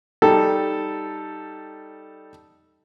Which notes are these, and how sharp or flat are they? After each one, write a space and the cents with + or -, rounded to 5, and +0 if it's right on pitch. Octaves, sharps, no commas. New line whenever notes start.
G3 +0 D#4 +0 A4 +0